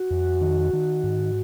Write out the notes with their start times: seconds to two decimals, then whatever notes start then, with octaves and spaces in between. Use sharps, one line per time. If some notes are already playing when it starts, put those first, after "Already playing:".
Already playing: F#4
0.11 F2
0.41 D#3
0.73 D#3
1.04 G#2